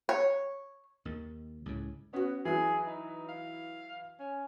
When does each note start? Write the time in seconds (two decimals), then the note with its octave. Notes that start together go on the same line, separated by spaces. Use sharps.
0.09 C#5
1.05 D#2 D#3
1.66 C#2 A2
2.13 B3 C#4 F#4
2.45 E3 F#3 G#4
2.87 D#4
3.29 F5
4.19 C#4